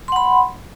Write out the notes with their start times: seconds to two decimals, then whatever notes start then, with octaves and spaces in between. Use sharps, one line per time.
0.08 C6
0.12 F#5
0.16 B5